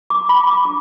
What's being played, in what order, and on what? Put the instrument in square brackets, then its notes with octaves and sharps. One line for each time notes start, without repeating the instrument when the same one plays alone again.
[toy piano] D6
B5
D6
D4 D6